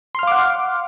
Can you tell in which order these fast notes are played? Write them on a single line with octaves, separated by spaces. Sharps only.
C6 F6 F5 D6 F#5